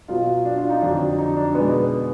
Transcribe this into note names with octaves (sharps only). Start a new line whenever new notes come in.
B2 F#3 F4
D4
F4
D#4
F2 D3 F#3 D4
D#4
D4
B2 G#3 B3
B3